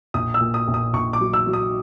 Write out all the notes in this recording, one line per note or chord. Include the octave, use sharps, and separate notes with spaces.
A#1 D#6
E6
A#2
D#6
A#1
D#6
A#1 C#6
D6
F#3
E6
F#3
D#6